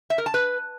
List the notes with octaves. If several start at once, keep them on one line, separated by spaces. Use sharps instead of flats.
E5
A#4
A5
B4